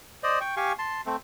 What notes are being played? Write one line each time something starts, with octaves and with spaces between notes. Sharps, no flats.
C5 D5 D#5
G5 C#6
G4 F5 G#5 C#6
A5 C6
A3 C4